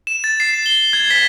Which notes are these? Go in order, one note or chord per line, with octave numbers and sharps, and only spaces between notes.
E7
A6
C7
G7
G#6
B6